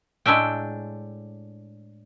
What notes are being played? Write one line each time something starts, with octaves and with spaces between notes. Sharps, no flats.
A2 G#3 D4 E5 G5